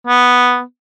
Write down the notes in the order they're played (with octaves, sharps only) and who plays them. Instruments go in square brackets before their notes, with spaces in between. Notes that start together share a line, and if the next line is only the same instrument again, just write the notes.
[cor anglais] B3